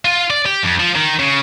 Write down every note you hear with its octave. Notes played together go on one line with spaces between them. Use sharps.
F4
D5
G4
F2
F3
D#3
C#3